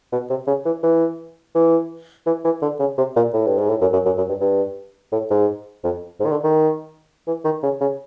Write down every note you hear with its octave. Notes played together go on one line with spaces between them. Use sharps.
B2
C3
C#3
E3
E3
E3
E3
E3
D3
C#3
C3
A#2
A2
G2
G#2
A2
F#2
F#2
F#2
F#2
G2
G2
A2
G#2
F2
G#2
D#3
D3
D#3
E3
D#3
C#3
C#3